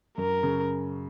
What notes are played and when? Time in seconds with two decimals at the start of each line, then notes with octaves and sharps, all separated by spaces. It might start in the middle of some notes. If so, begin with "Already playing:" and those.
0.18 F#2 A#4
0.43 C#3